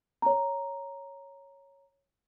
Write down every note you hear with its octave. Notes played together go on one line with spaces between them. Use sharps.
C#5 A#5